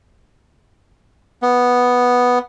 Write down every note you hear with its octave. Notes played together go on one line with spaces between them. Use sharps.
B3